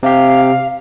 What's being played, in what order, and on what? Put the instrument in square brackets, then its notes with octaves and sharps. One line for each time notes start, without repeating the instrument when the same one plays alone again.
[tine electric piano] C3 G4 [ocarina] F5